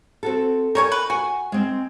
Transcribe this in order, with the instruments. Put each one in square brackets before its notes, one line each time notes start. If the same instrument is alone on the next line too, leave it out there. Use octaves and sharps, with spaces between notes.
[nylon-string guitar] C4 F#4 A4
[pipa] G3 C#5 G#5 [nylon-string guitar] A#4
[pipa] B4
[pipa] F#4 [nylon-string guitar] G#5
[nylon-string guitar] G#3 C4